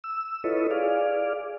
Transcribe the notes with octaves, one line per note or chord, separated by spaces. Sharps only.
E6
E4 F4 A4 B4 C#5 D#5
G#4 D5 F5